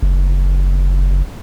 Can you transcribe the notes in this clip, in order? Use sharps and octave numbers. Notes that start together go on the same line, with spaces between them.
F#1